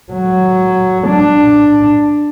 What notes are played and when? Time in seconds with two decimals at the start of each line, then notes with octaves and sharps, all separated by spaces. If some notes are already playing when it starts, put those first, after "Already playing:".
0.13 F#3
1.08 D4